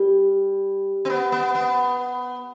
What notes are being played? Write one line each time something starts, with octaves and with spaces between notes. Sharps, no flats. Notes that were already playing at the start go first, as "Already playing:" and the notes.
Already playing: G3
C4
B3
B3
B3